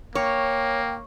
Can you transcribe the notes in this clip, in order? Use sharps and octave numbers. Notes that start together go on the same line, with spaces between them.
A#3 C#5 G5